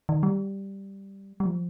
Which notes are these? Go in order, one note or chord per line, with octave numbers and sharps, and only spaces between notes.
D#3
G3
G3
F3